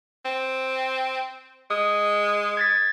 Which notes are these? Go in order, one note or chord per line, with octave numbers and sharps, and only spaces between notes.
C4
G#3 D#6
G#6 A6 B6